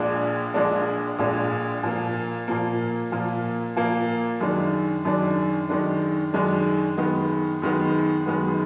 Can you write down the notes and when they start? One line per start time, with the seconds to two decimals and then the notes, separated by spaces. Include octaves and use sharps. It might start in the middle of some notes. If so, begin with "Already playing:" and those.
Already playing: A#1 A#2 G#3 D4
0.54 A#1 A#2 G#3 D4
1.19 A#1 A#2 G#3 D4
1.83 A#2 F3 A#3
2.48 A#2 F3 A#3
3.12 A#2 F3 A#3
3.76 A#2 F3 A#3
4.40 F#2 D#3 G#3 D4
5.05 F#2 D#3 G#3 D4
5.69 F#2 D#3 G#3 D4
6.33 F#2 D#3 G#3 D4
6.97 F#2 D#3 G#3 B3
7.62 F#2 D#3 G#3 B3
8.26 F#2 D#3 G#3 B3